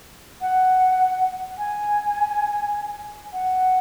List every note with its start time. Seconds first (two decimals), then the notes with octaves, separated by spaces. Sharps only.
0.41 F#5
1.58 G#5
3.33 F#5